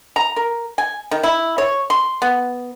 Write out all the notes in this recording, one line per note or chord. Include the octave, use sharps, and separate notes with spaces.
A#5
A#4
G#5
D#3
E4
C#5
C6
B3